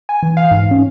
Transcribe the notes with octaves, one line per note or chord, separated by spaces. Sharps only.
G#5
E3
F5
G#2
C#4